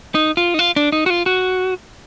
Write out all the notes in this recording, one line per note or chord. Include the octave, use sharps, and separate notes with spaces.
D#4
F4
D#4
F4
D4
D#4
F#4
F4
F#4